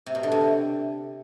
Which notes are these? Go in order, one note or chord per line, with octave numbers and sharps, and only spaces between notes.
C3
B2
D3
C3